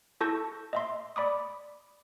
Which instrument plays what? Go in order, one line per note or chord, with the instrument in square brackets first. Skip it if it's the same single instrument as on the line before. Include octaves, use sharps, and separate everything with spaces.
[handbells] E4 A4 A5 C#6 G6 A#6
D#5 E5 C6
D5 B5 D6 D#6